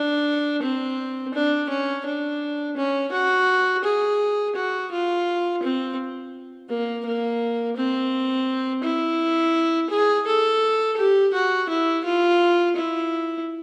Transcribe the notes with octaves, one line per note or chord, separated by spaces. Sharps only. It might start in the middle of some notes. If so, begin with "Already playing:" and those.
Already playing: D4
C4
D4
C#4
D4
C#4
F#4
G#4
F#4
F4
C4
A#3
A#3
C4
E4
G#4
A4
G4
F#4
E4
F4
E4